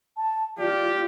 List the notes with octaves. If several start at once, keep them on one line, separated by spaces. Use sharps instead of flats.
A5
F4 G4 D5